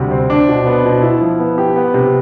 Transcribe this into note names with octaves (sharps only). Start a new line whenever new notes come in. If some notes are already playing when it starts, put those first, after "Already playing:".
Already playing: D2 C3 G3
C4
D4
B2
B3
B2
E4
F3
B3
G4
B3
C3